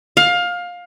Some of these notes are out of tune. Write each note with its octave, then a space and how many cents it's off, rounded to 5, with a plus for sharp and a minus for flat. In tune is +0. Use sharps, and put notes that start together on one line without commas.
F5 +20